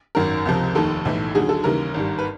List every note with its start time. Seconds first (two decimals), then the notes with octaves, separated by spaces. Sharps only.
0.15 G#1 F#2 D#3 A#4
0.45 C#2 C3 F3
0.75 F1 D#2 D#3 A4
1.05 B1 A2 E3
1.35 D#2 D3 F#3 G#4
1.49 A4
1.64 D#2 C#3 E3 G3 A#4
1.94 G#1 G2 D#3 G3
2.18 B4